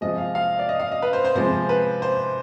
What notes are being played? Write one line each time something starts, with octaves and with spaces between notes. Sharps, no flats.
C3 F3 G#3 D#5
F5
F5
D5
D#5
F5
D#5
B4
C5
C5
C3 F3 G#3 C5
B4
C5